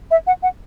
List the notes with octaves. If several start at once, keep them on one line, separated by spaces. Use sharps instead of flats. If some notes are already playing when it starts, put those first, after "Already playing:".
E5
F#5
F#5